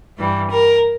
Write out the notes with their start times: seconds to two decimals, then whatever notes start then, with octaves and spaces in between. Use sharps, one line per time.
0.18 G2 E3 G3
0.49 A#4